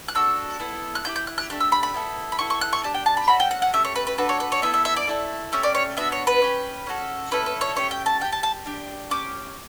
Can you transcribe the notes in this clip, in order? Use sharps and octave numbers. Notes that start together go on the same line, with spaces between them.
F#6
D4 F#4 A4 E6
B3 E4 A4
F#6
B3 E4 G4 G6
G6
F#6
F#6
A3 D4 G4 F#6
E6
B5
B5
B3 E4 A4
B5
B3 E4 A4 C#6
C#6
F#6
C#6
D4 G4 A5
G5
A5
B5
C#4 F#4 A4 B5
G5
F#5
F#5
A3 C#4 G4 E5
C#5
B4
B4
D4 F#4 A4 B4
C#5
B4
C#5
B3 E4 A4 E5
E5
E5
D5
A3 E4 A4
A3 C#4 G4 E5
D5
C#5
B3 D4 F#4 E5
C#5
B4
C#4 G4
C#4 F#4 A4
C#4 E4 A4 B4
B4
C#5
A3 C#4 G4 C#5
G5
A5
D4 G5
G4
A5
A5
D4 G4
C#4 G4 D6